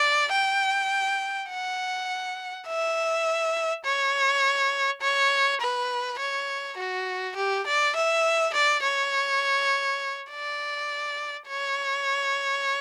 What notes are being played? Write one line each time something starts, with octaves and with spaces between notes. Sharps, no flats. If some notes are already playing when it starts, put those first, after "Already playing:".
Already playing: D5
G5
F#5
E5
C#5
C#5
B4
C#5
F#4
G4
D5
E5
D5
C#5
D5
C#5